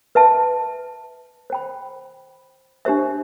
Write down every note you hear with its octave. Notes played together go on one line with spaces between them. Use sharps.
B4 E5 A5
C5 G5 B5
D4 G4 C5 E5